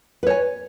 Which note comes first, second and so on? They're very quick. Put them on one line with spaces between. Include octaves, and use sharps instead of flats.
B4 C#5 G#5